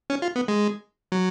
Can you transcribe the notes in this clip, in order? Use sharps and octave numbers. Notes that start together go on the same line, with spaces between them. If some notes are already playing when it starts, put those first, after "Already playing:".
C#4
F4
B3
G#3
F#3